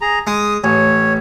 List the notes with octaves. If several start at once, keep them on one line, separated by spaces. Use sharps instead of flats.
G#4 A#5
G#3 D#6
A1 C#5